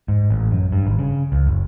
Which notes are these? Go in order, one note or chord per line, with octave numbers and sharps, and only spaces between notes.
G#2
A1
F#2
G2
G#1
C#3
C#2
F#1